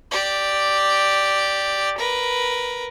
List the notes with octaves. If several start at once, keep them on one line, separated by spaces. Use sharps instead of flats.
G4 D5
A#4 B4